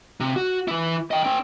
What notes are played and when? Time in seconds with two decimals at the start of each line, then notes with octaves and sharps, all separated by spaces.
0.20 C3
0.36 F#4
0.68 E3 E4
1.11 D#5 G5
1.24 C#4 G5